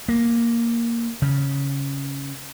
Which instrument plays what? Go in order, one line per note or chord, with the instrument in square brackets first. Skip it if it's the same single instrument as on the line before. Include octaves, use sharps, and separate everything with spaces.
[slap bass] A#3
C#3